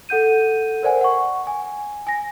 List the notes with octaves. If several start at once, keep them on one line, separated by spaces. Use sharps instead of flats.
A4 F#5 G6 D#7
A#4 C5 D5 F#5 G#5
F#5 C#6
G#5
G#5 A#6